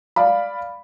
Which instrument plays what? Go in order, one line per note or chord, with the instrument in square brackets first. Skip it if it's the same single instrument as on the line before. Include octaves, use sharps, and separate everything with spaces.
[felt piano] D5 F5 B5